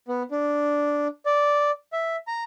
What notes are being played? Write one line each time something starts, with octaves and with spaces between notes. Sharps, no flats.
B3
D4
D5
E5
A#5